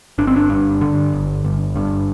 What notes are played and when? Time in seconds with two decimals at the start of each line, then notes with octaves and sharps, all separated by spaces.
0.18 G1 D4
0.27 C4
0.36 D4
0.49 G2
0.81 D3
1.13 G1
1.44 G1
1.76 G2